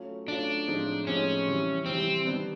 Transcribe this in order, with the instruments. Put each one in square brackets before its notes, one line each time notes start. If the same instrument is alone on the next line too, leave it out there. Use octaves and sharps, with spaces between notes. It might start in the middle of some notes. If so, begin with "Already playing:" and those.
Already playing: [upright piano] F#3 A3 C#4 F4
[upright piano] F#3 A3 C#4 F4 [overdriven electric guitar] D4
[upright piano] A2 F3 G#3 C4 D#4
[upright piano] A2 F3 G#3 C4 D#4 [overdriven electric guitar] C#4
[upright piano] C3 E3 G3
[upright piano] C3 E3 G3 [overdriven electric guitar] C4
[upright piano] D#3 G3 B3 D4